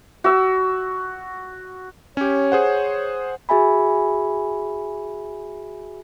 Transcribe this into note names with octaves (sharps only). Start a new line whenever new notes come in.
F#4 E6
C#4 G4 C#5
G#4 C5 F#5
F#4 G#4 E5 G#5 B5